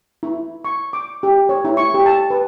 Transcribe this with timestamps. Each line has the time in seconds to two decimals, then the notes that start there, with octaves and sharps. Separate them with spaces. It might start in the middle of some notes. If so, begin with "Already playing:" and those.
0.23 E4
0.65 C#6
0.93 D6
1.23 G4
1.49 C#5
1.65 E4
1.77 C#6
1.94 G4
2.06 A5
2.30 B4